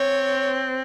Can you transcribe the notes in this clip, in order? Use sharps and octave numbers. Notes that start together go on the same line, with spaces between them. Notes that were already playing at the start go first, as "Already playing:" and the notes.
Already playing: C4 C#5